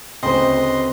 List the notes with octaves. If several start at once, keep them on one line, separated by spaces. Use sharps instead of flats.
D2 C#3 C4 B4 C5 D#5 C6